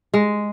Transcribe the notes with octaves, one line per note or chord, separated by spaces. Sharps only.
G#3